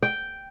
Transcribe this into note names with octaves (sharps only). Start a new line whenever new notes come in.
G5